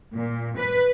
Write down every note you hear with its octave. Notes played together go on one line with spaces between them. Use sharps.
A#2
B4